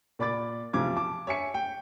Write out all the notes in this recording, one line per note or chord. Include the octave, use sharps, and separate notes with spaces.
A#2 D5 B5 D6 A6
B1 C3 F3 D6 G#6
A5 D6
C#5 E5 G#5 C#7
G5